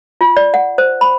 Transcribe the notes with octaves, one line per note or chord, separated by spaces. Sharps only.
F4
D5
F#5
C5
B5